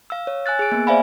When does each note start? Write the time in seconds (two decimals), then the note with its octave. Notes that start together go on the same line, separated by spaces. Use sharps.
0.10 F5 E6
0.27 C#5
0.46 G#5 E6 F#6 A6
0.59 G#4 D7
0.72 A#3 B3
0.87 C5 D5 E5 F5 G#5 B5